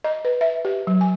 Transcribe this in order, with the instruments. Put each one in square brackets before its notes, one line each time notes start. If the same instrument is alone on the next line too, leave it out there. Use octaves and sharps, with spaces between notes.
[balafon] D#5
B4
E5
G4
F#3
G#5